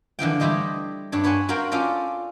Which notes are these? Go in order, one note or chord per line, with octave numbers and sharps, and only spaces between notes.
D3 E3 F3 G5
G3 A3 E4 G4 C5 D#5
G2 D4 C#5
B4 C#5 F#5 G#5 C6
F#4 A#4 C5 F5 G5
C#4 F4 A4 C5 D5